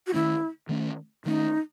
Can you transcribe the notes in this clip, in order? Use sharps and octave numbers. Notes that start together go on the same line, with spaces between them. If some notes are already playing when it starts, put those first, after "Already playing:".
F#4
D#3 A3 C#4 E4
D#3 A3 C#4
D#3 A3 C#4 D#4